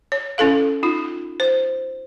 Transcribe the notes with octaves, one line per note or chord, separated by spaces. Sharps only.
C#5
C#4 E4 A4 F5
D#4 F4
C5